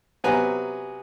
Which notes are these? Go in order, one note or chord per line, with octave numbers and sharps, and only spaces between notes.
C3 F#3 B3 B4 G#5 A#5